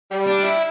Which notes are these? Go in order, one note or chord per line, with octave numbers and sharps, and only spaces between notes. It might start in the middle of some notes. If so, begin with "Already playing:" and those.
G3
D4
E4